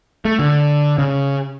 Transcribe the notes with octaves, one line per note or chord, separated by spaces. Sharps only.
A3
D3
C#3